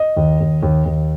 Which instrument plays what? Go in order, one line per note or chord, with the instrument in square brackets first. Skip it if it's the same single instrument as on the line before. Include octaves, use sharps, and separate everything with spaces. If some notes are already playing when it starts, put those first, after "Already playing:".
Already playing: [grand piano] D#5
D#2
D#2
D#2
D#2